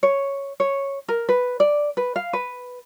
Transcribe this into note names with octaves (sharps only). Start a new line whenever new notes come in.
C#5
C#5
A#4
B4
D5
B4
F5
B4